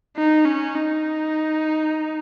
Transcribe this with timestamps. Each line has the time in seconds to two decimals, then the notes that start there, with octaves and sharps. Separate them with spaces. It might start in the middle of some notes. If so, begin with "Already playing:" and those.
0.17 D#4
0.45 C#4
0.75 D#4